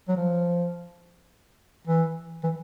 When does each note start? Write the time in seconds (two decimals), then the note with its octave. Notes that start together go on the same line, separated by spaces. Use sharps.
0.08 F#3
0.17 F3
1.87 E3
2.44 E3